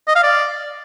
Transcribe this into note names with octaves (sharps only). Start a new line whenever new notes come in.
D#5
F5
D5